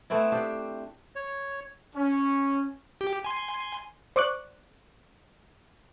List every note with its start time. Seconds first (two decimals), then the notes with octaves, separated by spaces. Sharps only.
0.10 A3 B3 C4 E4
0.32 D4 G4 C5
1.16 C#5
1.95 C#4
3.01 G4
3.25 G#5 C6
4.16 C5 D5 C#6 D6 F#6